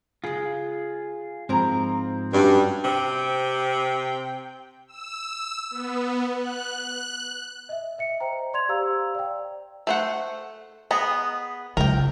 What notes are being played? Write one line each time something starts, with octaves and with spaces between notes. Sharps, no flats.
C#3 G#3 F4 G#4
G#2 F3 C4 E4 A#4 A#5
G2 C#4 D4 F#4
C3 G5
E6
B3
F#6
D#5 E5
D#5 E5 C#7
C5 G5 A#5
D5 C6 G#6 F7
G4 C5 F5 A#5 E6
D5 G5
A3 C5 F#5
B3 G#4 D#5
C#2 D4 A#4 G5